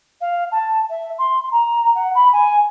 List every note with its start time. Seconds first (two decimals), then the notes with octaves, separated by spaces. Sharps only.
0.20 F5
0.51 A5
0.89 E5
1.18 C6
1.51 A#5
1.94 F#5
2.15 B5
2.32 G#5